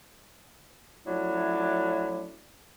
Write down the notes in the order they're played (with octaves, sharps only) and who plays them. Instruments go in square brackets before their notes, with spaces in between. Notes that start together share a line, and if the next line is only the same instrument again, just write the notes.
[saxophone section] F3 F#3 A3 C#4 D4 E4